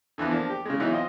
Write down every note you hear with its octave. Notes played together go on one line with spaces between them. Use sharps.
D3 E3 F3 B3
F3 A#3 D4
G4
C#3 G#3
E3 F#3 B3 D#4 E4
C4 F4 D#5